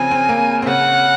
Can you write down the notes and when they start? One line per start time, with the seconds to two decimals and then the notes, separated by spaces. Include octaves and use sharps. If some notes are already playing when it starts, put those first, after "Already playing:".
Already playing: C#3 F3 C4 C#4 G#5
0.11 C4
0.29 A#3
0.62 C4
0.67 C#3 C#4 F#5